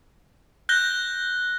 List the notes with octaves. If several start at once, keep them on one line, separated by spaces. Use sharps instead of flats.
F#6 G6 A#6 G7